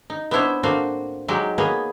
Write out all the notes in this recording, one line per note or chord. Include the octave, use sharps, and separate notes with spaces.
D#4
B3 C4 D4 E4 C5 C#5
A2 A#3 C4 D4 F#4 F5
F#3 G#3 D#4 G4
A#3 B3 G#4 C#5